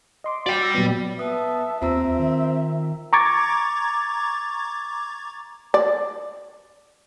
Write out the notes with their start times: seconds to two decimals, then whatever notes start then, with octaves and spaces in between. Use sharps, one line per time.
0.24 D#5 C6 D6
0.46 F#4 D5 G5
0.63 E6 A#6
0.75 A#2 F#3 B3
1.19 B3 E5 A5 D#6
1.82 D#2 C4 F4 E5 A#5 E6
2.19 D#3
3.13 A#5 C#6 D6 G#6 A6
5.74 D5